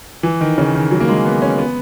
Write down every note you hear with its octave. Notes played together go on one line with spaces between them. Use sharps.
E3
D#3
C#3
D#3
F#3
A#3
G#3
B3
C#4
B3